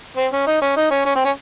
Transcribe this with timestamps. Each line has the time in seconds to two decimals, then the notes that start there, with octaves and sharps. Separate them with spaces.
0.17 C4
0.32 C#4
0.47 D#4
0.62 C#4
0.77 D#4
0.91 C#4
1.06 C#4
1.16 C4
1.25 C#4